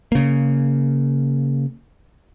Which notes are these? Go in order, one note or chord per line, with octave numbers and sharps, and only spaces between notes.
C#3 A#3